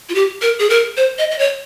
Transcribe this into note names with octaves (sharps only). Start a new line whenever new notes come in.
F4
G4
A#4
G#4
A#4
C5
D#5
D#5
C#5